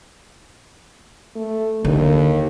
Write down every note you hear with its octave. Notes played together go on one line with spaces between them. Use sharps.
A3
D#2 D3